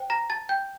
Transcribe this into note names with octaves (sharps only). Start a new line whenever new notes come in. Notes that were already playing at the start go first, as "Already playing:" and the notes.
Already playing: C5 G5
A#5 A#6
A5 A6
G5 G6